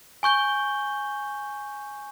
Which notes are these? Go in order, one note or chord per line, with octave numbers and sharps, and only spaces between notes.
G#5 C#6 G6 G7